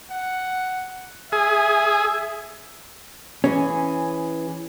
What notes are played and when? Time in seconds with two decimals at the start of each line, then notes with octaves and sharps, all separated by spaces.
0.10 F#5
1.32 G#4 E5
3.44 E3 C#4 G#4